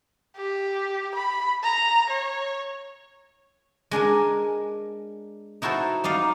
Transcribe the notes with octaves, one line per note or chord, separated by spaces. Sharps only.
G4
B5
A#5
C#5
G#3 D4 A#4 G#5
D#4 E4 F#4 A4 C5
G3 D#4 D5 F5